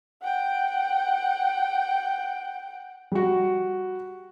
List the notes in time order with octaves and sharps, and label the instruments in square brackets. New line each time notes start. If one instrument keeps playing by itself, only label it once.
[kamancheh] F#5 G5
[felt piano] G3 F#4